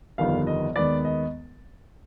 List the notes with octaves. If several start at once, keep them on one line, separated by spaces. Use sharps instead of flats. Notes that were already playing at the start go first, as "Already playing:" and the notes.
G1 F2 D#3 G3 B3 F5
D#5
D#2 D#3 G#3 B3 D5
D#5